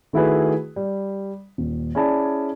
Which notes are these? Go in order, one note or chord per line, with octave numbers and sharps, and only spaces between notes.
D#3 A3 E4 F#4 G#4 B4
G3
D#1
C#4 E4 G#4 D5 A5 B5